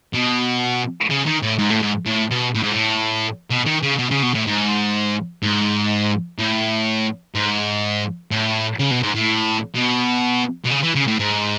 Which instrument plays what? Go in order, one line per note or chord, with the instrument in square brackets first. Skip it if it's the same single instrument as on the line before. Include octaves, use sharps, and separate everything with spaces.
[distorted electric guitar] B2
C#3
D#3
A2
G#2
A2
G#2
A2
B2
A2
G#2
A2
B2
D#3
C#3
B2
C#3
B2
A2
G#2
G#2
A2
G#2
A2
C#3
B2
G#2
A2
B2
B2
C#3
E3
C#3
A2
G#2